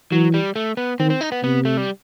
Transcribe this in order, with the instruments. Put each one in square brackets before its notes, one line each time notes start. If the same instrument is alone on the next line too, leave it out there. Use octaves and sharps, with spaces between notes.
[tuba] E3 [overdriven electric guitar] F#3
[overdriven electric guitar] G3
A3
B3
[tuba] D#3 [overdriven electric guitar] C4
[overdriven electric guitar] C4
D#4
B3
[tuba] C3 [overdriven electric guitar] B3
[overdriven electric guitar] A3
G3